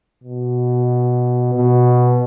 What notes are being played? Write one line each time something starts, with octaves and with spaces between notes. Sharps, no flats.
B2
B2